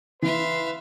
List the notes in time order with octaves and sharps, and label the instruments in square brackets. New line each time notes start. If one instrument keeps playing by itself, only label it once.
[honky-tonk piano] E3 [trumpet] B4 [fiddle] E5 F5 [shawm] C6